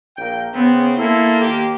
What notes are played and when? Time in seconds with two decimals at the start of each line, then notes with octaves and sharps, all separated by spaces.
0.17 A#1 A#3 G5
0.54 C#3 B3 C4
0.98 A#3 E4 A4 C6
1.41 D#2 G4